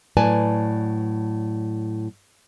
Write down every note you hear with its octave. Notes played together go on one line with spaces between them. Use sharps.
A2 F#3 B4 D5 G#5 A5